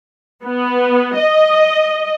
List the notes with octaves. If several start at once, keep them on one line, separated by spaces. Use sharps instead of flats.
B3
D#5